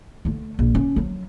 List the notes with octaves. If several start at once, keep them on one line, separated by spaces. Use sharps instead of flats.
D3 A3
A#1
C#4
F3 F#3